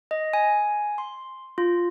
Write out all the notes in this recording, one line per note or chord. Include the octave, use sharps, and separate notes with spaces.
D#5
G#5
C6
F4